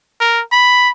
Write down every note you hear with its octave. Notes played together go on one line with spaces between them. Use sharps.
A#4
B5